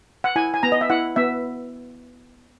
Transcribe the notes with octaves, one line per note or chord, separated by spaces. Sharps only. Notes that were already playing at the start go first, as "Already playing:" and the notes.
F#5
E4 G#5
G#5
B3 A#5
D#5
E5
E4 F#5
B3 E5